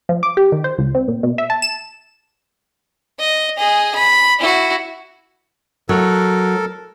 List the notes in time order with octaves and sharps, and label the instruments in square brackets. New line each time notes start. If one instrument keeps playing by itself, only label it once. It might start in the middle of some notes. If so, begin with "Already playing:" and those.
[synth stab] F3
D6
G4
D#3
C5
C#2
C4
A#2
B2
E5
A5
E7
[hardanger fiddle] D#5
G#4 D#5
B5
E4 F#4
[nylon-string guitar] F#3 [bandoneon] A4 A#4